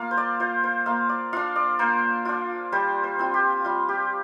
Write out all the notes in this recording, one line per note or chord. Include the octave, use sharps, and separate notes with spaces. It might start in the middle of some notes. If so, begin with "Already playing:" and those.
Already playing: A#3 F4 F5
C5
D5
F4 C5
C5
A#3 F5
D5
D4 F4 F5
D5
A#3 C5
D4 F4
G3 C5
C5
C4 F4
G4
G3 F4
G4